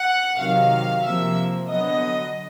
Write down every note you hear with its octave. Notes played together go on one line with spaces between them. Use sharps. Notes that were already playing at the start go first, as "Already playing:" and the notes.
Already playing: F#5
C3 D#3 F#3 F5
C3 F3 A#3 E5
D3 F#3 B3 D#5